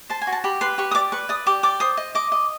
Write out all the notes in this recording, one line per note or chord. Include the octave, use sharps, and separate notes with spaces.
C5 A5
G#5
F#4
A5
G4 B5
B4 C6
G4 C#6
D#6
D5 D6
B4 C#6
D5 D#6
G4 D6
D5 D6
C5 D#6
D#5
D#5 D6
D#5